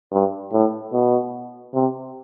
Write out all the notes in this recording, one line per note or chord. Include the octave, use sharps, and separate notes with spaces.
G2
A2
B2
C3